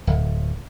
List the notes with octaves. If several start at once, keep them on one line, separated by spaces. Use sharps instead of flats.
D1